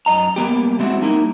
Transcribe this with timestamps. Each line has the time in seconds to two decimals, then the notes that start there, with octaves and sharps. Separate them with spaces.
0.06 F#2 D#5 A#5
0.36 G3 A#3 B3 G4
0.79 G3 G#3 C4 D#4 E4 F#4
1.02 G3 A#3 D#4 E4